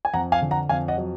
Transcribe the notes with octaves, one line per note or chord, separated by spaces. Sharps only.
G#5
F2 F#5 A#5
F5 G#5
D3
F#5 A#5
F2 F5 G#5
D#5 F#5
F#3